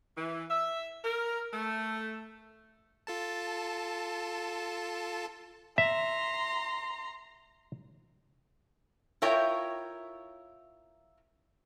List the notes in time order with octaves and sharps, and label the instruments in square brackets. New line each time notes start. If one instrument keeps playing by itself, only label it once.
[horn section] E3
E5
A#4
A3
[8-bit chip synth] F4 A4 A5
[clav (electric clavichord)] E5 [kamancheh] A#5 C6
[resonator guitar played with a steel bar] E4 F4 A#4 C#5 G5